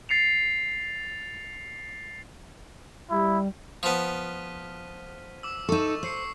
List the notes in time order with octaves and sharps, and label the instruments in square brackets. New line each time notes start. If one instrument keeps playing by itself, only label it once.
[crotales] A6 C7 C#7 F7
[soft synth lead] G3 [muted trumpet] E4
[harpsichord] F3 B3 [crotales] F6 B6 D#7
[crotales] D6 E6
[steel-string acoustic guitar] D#4 A4 [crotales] C#6 D6
[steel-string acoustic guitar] C5 [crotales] E6 C7 C#7